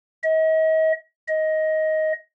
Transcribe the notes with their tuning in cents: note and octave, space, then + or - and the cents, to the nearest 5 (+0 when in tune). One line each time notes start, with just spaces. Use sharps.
D#5 +40
D#5 +15